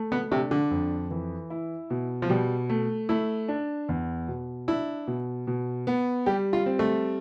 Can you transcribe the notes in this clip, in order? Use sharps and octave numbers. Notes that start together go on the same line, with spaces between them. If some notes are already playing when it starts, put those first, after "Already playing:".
Already playing: A3
B3
C3 D4
D3
F2
E3
E4
B2
F3
B2 G3
A3
A3 E4
D4
E2
B2
D4 E4
B2
B2
B3
G3 G4
F4
C4
A3